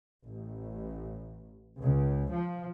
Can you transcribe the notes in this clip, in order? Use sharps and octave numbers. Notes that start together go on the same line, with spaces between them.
A1
C#2
F3